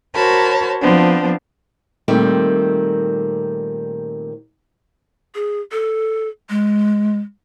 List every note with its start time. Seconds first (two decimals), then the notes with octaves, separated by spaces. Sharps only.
0.15 F#4 A#4 C5 C#5 A5 B5
0.81 F3 B3 C4 D4
2.08 A#2 D#3 G3 A3 C4
5.35 G#4
5.72 A4
6.50 G#3